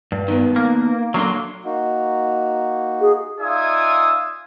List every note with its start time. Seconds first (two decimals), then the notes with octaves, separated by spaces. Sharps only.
0.12 G2
0.28 D#3 B3
0.56 A#3
1.14 C#2 D3 F#3 A#3 C6
1.65 A#3 D#4 F#4
3.01 G#4
3.41 D#4 F4 D5 E5 G#5 D#6